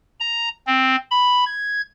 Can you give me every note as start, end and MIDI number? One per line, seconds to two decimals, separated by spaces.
0.20 0.49 82
0.67 0.96 60
1.11 1.44 83
1.46 1.81 92